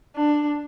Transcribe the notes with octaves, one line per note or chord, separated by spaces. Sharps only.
D4